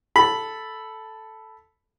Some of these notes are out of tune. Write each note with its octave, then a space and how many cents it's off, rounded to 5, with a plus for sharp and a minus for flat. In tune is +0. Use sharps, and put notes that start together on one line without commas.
A4 +0 B5 +0